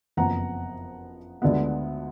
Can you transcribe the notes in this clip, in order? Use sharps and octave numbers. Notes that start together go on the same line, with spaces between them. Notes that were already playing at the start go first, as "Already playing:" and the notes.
F#1 F2 F3 B3 F#5 A#5
D2 D3 G#3 B3